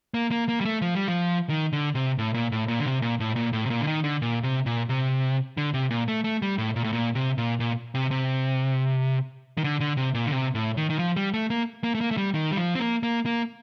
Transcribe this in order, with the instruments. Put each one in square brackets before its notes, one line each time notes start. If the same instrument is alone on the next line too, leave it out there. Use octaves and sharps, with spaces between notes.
[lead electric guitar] A#3
A#3
A#3
G3
A3
F3
G3
F3
D#3
D3
C3
A2
A#2
A2
A#2
D3
C3
A#2
A2
A#2
A2
C3
A#2
D3
D#3
D3
A#2
C3
A#2
C3
D3
C3
A#2
A3
A3
G3
A2
A#2
A2
A#2
C3
A#2
A#2
C3
C3
D#3
D3
D3
C3
A#2
D3
C3
A2
D#3
D#3
F3
G3
A3
A#3
A#3
A3
A#3
A3
G3
D#3
G3
F3
C4
A#3
A#3
A#3